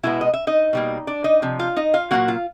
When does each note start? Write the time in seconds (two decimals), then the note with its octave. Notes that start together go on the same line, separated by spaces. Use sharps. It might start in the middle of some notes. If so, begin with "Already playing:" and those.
0.03 B2 G#3 B3 E4 E5
0.21 D#5
0.34 E5
0.47 D#4 D#5
0.73 B2 G3 A#3
1.07 D4 D5
1.24 D#4 D#5
1.42 C3 F3
1.59 F4 F5
1.76 D#4 D#5
1.94 F4 F5
2.11 A#2 F#3 A#3 F#4 F#5
2.28 F4 F5